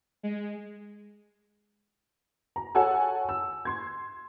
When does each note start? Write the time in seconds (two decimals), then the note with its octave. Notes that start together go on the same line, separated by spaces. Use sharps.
0.23 G#3
2.56 A#5
2.75 A4 C#5 F#5 G#5 A5 E6
3.29 E6
3.65 C6 G#6